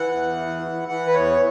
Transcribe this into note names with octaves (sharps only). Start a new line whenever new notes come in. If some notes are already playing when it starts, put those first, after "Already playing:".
Already playing: E3 F#5
E2
E3
E3
E3 F#5
B4
E2 C#5